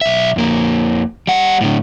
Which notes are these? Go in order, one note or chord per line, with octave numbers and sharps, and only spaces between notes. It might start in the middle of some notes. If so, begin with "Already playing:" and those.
B1 E5
F2 A#3
G3 F#5
A2 D3